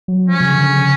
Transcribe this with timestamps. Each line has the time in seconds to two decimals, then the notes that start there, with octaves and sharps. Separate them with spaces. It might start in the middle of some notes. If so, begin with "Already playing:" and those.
0.08 F#3
0.28 F3 C#4
0.41 C#3
0.54 D3
0.67 C#3